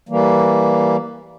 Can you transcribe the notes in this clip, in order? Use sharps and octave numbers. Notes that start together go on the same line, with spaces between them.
E3 G3 A#3